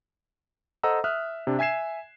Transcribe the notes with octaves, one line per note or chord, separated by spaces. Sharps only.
A4 C5 D#5 F#5 A#5 E6
E5 D#6 F6 F#6
C3 D4
E5 G#5 G#6 C7 E7